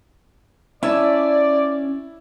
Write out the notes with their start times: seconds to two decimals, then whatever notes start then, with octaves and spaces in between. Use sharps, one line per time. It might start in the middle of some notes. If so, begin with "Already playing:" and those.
0.83 C#4 E4 D5 E5 G#5 A5